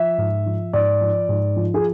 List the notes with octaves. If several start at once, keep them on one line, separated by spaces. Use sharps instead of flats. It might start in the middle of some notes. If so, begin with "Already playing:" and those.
Already playing: F3 E5
G#2
F3
G#2 D5
F3
G#2
F3
G#4